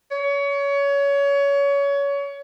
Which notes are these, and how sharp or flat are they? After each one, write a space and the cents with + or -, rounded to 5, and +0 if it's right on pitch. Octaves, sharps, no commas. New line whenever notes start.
C#5 +25